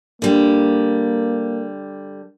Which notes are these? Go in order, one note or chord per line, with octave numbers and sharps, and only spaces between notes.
D3 G3 A#3